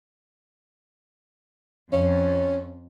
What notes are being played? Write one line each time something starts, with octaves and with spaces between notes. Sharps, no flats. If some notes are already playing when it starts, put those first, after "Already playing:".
F2 C#4